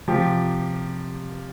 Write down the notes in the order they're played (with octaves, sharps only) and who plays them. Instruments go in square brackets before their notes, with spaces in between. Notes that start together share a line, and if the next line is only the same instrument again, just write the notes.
[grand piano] C3 F3 G4